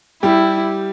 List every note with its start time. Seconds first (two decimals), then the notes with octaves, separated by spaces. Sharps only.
0.23 G3 E4 G4